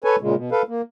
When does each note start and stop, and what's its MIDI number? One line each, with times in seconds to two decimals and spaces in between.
0.04 0.16 69
0.04 0.16 71
0.04 0.16 73
0.04 0.16 80
0.21 0.35 46
0.21 0.35 49
0.21 0.35 56
0.35 0.50 47
0.51 0.62 69
0.51 0.62 71
0.51 0.62 77
0.68 0.82 58